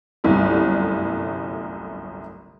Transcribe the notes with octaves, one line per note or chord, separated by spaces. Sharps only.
G1 C2 F#2 A2